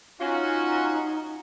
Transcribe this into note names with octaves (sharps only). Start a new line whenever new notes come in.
C#4 D#4 F4 F#4